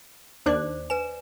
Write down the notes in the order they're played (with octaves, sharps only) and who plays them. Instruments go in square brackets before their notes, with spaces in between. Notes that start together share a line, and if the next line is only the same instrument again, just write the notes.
[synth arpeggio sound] D#2 D4 F#6 [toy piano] C5 D5 D6
[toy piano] B4 G#5 [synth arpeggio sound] E7